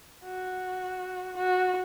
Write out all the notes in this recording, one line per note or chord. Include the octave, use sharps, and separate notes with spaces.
F#4
F#4